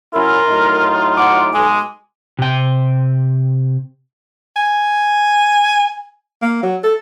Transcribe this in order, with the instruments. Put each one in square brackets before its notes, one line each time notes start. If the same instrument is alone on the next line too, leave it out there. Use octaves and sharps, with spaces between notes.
[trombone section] F#3 C#4 E4 [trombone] F4 [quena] A#4
[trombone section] A2 F#3 D#4
[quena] F#5 [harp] D6
[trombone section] B1 [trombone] G#3 [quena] G#5
[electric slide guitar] C3 G5
[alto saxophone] G#5
A#3
F#3
A4